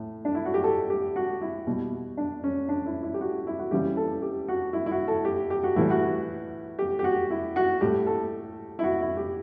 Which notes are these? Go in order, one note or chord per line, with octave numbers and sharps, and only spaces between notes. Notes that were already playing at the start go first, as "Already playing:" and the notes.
Already playing: A2
D4
E4
F#4
G4
A4
G4
F#4
E4
B2 G3
D4
C#4
D4
E4
E4
G4
F#4
E4
F#4
C#3 E3 G3 G4
A4
G4
F#4
E4
E4
F#4
A4
G4
G4
F#4
A2 E3 G3 E4
F#4
G4
G4
F#4
E4
F#4
A2 G3 G4
A4
E4
F#4
E4
G4